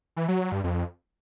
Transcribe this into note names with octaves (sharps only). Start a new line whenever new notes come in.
E3
F#3
F#3
G2
F2